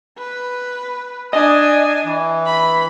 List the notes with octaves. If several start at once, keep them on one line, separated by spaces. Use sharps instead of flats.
B4
D4 D#5 G#5
E3
B5